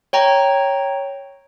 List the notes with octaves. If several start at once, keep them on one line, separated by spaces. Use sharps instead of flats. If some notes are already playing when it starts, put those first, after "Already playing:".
C#5 G5 A#5